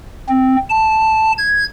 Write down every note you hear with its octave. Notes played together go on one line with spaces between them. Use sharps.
C4
A5
G#6